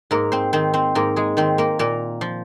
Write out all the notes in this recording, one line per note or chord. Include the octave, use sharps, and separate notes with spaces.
G#2 A#3 A#4
C4 C5
D#3 C4 C5
C4 C5
G#2 A#3 A#4
G#3 G#4
D#3 C4 C5
A#3 A#4
A#2 A#3 A#4
F3